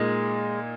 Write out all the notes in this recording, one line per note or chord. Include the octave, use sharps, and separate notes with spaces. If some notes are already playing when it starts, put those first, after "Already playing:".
Already playing: A#2 G#3 A#3 D#4